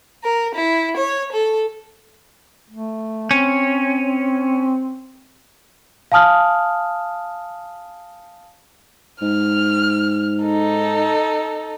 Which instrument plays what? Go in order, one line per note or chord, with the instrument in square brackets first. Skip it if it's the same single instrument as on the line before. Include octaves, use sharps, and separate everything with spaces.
[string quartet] A#4
E4
C#5
A4
[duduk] A3
[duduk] C4 [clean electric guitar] C#4
[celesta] F5 G#5 A5 D#6 F6
[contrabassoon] G#2 [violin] F6
[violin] D#4 A4